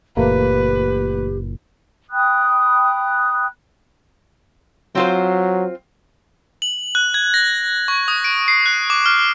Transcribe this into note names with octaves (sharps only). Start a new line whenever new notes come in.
F#1 A#2 E3 A3 A#3 G4 B4
G5 B5 D#6 F#6
F#3 C4 F4 C5
F#7
F#6
G#6
A#6
C#6
D#6
D7
C7
F#6
D6
F6